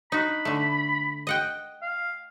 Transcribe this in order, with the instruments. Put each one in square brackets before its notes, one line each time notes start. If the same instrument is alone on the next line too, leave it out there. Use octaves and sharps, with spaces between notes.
[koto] D#4 F#4 [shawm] B5
[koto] D3 A3
D#5 F#5 G5
[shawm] F5